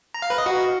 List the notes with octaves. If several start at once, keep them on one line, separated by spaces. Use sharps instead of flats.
A#5
F5
B4
D#5
F#4